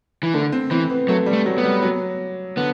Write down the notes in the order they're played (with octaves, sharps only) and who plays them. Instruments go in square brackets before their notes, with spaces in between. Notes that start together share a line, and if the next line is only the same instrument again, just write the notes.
[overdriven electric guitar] E3
[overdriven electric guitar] D3 [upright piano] A3
[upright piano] C4
[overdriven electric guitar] E3 [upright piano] C4
[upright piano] B3
[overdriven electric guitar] F#3 [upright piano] A3
[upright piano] G3
[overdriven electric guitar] A3
[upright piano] F#3
[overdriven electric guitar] B3
[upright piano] G3
F#3
[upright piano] D3 [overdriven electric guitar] B3